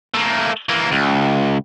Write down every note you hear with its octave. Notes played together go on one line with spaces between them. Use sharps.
A3 A#3
E3 A#3
C#2